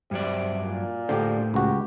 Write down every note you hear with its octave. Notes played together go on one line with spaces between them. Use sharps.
G2 C3 F#3 D5
A#2
A2 D3 G4 C5
C#2 F#4 G4